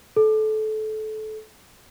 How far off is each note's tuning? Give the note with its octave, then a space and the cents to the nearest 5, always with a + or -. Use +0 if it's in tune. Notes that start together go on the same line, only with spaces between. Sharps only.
A4 -25